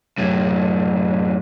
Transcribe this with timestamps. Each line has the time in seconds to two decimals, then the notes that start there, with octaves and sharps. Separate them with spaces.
0.18 F#2 A2